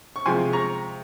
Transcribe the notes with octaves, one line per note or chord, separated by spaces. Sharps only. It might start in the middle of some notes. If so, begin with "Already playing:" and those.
C#6
C3 F3 G#3 G#5 C6
A#5 C#6